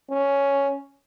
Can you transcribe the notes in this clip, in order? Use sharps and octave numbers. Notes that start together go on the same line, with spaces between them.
C#4